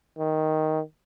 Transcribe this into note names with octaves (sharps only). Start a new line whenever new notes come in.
D#3